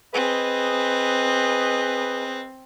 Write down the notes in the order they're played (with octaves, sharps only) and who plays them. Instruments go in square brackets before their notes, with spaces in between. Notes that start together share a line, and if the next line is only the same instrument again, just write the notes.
[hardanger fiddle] C4 [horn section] G#4 B4 D#5